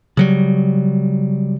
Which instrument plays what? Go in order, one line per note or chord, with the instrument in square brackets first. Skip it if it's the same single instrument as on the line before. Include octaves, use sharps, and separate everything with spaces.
[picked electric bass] C#3 F#3 G3